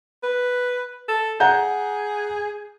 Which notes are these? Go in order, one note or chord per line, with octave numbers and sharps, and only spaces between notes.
B4
A4
G#4 F#5 A#5 G6